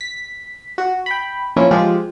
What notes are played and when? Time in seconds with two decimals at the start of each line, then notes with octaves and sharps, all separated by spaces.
0.01 B6
0.78 F#4
1.06 G5 B5
1.56 F3 A#3 C#4 E4
1.71 F3 G#3 F4 G4